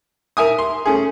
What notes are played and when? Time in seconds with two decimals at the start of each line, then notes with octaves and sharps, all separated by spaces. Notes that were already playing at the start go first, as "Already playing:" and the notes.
0.37 A#4 E5 G#5 D#6
0.58 C6
0.86 A3 C#4 G#4